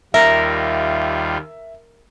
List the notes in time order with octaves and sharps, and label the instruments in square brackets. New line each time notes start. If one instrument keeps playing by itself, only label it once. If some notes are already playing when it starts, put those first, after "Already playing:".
[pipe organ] D#2 G3 F4 [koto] A#4 [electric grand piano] E5